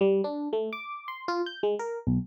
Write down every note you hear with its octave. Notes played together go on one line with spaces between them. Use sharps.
G3
D4
A3
D6
C6
F4
G6
G#3
A#4
B1